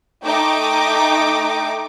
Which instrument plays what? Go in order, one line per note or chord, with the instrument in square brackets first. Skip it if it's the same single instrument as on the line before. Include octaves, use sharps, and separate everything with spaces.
[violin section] A3 D#4 G5 D6